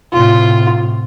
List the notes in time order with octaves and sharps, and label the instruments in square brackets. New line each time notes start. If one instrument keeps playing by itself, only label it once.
[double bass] A2 C3 [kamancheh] F4